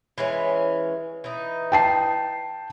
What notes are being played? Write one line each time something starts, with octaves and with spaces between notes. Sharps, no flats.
E3 G#3 C#4
E3 D#4
G5 A5 C7